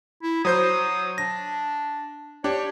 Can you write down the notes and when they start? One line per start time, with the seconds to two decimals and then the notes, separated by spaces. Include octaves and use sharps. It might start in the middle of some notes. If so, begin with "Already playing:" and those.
0.23 E4
0.45 F#3 C5 D#6 G6
1.18 D4 A#6
2.44 D4 G4 C#5